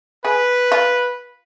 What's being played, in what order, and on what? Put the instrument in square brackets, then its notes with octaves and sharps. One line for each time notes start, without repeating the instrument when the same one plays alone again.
[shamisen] G#4 [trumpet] B4
[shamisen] F4